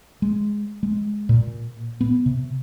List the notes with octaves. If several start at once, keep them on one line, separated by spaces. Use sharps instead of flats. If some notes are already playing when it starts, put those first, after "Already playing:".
G#3
G#3
A#2
B3
C3